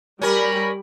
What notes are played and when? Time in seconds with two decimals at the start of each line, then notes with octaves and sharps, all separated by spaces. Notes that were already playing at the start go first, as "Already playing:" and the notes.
0.22 G3 C#4 A#4 B5